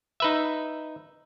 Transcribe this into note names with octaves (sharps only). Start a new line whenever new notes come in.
D#4 B4 E5